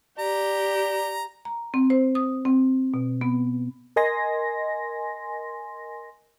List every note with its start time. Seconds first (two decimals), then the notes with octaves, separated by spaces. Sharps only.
0.19 G4 D5 A#5
1.45 A#5
1.74 C4
1.90 C5
2.15 D#6
2.45 C4
2.94 B2
3.21 B3
3.96 A#4 D#5 G#5 C6 A#6